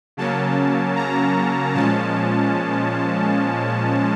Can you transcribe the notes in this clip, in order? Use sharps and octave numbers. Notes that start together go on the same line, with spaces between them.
C#3 F#3 A#3 C#4 A5
A#5
A#2 F3 G#3 C#4 A5